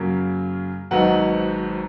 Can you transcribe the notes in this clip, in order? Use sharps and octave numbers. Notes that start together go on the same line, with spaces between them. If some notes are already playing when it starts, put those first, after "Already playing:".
Already playing: F#2 C#3 F#3 A#3
G#1 G#2 F#3 B3 D#4 F#5